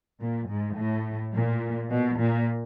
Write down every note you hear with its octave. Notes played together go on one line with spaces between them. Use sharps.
A#2
G#2
A2
A#2
B2
A#2